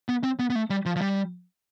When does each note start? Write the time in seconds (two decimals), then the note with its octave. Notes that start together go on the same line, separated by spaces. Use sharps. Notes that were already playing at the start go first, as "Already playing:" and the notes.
0.09 B3
0.24 C4
0.39 B3
0.50 B3
0.55 A3
0.70 G3
0.86 F3
0.96 F3
1.01 G3